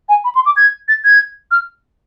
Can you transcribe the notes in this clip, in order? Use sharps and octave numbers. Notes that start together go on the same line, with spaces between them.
G#5
B5
C6
D6
G#6
A6
G#6
F6